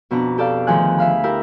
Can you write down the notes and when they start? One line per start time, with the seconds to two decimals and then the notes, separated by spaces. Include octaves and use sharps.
0.11 F2 B2 D4 B4 A#5
0.38 G4 A4 D5 F5
0.67 D2 D#3 F3 G#4 G#5 F#6
0.98 E5 F5 B5
1.24 E4 G4 A#4